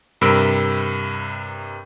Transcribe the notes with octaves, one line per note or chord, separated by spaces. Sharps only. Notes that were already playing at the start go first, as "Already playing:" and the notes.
G2 C3 A#4 B5 E6 D7